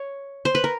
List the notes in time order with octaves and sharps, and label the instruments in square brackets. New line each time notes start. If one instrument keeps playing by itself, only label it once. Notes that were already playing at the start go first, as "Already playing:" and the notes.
Already playing: [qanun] C#5
C5
B4
A#4